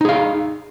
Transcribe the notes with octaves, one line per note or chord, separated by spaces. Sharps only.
D#4 G#4 F5